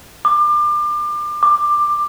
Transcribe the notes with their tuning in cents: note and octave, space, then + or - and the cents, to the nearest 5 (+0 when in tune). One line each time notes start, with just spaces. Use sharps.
D6 +30
D6 +15